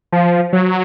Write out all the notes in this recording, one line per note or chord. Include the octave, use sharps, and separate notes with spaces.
F3
F#3